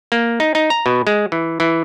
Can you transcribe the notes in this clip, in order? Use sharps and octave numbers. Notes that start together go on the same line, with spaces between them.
A#3
D#4
D#4
A#5
B2
G#3
E3
E3